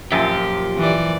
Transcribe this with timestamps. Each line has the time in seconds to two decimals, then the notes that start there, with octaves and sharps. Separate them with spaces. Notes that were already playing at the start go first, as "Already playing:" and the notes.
0.12 F#2 A#2 F3 G4
0.77 E3 D5